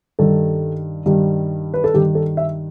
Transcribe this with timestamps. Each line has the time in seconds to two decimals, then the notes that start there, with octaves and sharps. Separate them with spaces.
0.19 G2 D#3 G3 A4
1.06 G2 D#3 G3
1.74 B4
1.84 A4
1.94 G2 D#3 G3 G4
2.15 A4
2.37 E5